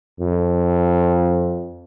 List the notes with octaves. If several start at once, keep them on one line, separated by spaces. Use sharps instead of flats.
F2